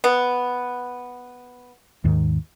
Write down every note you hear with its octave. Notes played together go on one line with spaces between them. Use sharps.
B3
D#2 G#2 D#3